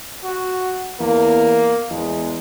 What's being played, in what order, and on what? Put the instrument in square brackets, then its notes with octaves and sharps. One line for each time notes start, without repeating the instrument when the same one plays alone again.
[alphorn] F#4
[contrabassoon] E2 [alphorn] A#3
[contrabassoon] E2 [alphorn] G#3